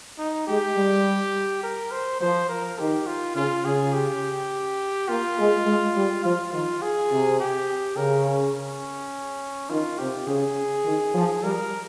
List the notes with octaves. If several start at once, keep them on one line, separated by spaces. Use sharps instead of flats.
D#4
G#3 G4
G3
A#4
C5
F3 C5
A#4
D#3 G4
F4
C#3 F4
C#3 G#4
G4
A#3 F4
G#3
G#3
G3
F3 F4
D#3 F4
G#4
C3
G4
C#3 A#4
C#4
C#4
D#3 F4
C3 G4
C#3 G#4
D#3
F3
G3 A#4